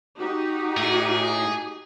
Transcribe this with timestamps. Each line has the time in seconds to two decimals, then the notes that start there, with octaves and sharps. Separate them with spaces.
0.19 D#4 F#4 G4
0.77 A2 G#4